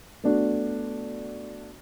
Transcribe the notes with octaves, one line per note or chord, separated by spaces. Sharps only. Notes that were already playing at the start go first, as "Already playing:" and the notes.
A3 B3 D4 F#4